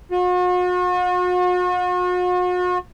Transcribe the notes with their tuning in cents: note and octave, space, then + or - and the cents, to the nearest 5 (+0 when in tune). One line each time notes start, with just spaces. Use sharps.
F#4 -45